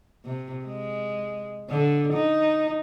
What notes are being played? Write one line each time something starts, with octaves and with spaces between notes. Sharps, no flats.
C3
G#3
D3
D#4